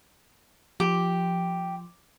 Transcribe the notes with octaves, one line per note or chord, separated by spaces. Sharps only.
F3 G4